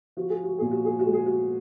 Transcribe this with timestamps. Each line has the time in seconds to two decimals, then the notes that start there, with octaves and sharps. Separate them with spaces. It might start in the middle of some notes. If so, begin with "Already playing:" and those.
0.17 F3 F#4
0.30 G#4
0.44 F#4
0.58 A#2 G#4
0.71 F#4
0.85 G#4
0.99 F#4
1.06 G#3
1.13 G#4
1.26 F#4